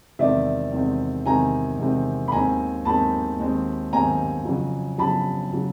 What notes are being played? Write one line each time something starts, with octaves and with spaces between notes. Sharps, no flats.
E2 C3 D#3 G#3 C4 D5 E5
E2 C3 D#3 G#3 C4
E2 C3 D#3 G#3 C4 G#5 A#5
E2 C3 D#3 G#3 C4
B5
D#2 D#3 G#3 C4 G#5 A#5
D#2 D#3 G#3 C4 A5 B5
D#2 D#3 G#3 C4
D#2 D#3 G#3 C4 G#5 A#5
F2 C#3 F#3
F2 C#3 F#3 A5 B5
C#3 F#3